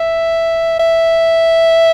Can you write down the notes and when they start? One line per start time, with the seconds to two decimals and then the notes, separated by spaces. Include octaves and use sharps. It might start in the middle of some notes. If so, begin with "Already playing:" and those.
Already playing: E5
0.80 E5